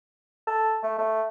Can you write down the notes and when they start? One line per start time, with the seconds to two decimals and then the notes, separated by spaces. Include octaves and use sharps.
0.47 A4
0.83 A3
0.98 A3